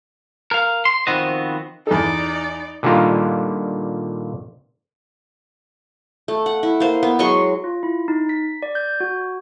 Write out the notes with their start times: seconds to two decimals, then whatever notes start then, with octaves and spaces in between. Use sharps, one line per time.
0.51 A#4 F5
0.85 C6
1.07 D#3 F3 B3 C4 F#4 D#5
1.87 E2 D#4 A4 D5
2.83 A#2 D3 D#3 G3 A#3 F4
6.28 A3
6.46 F#5
6.63 E4
6.80 A#3 C5
7.03 B3
7.19 F#3 G#3 C6 C#6
7.64 F4
7.83 E4
8.08 D#4
8.29 B6
8.62 D5
8.75 G6
9.00 F#4